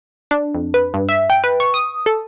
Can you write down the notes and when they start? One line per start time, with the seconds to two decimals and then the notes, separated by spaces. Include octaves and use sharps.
0.31 D4
0.55 F2
0.74 B4
0.94 G2
1.09 E5
1.30 G5
1.44 B4
1.60 C#6
1.74 D#6
2.06 A4